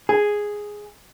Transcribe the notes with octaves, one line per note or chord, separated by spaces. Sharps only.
G#4